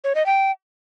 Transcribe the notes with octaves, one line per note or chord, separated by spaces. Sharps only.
C#5
D#5
G5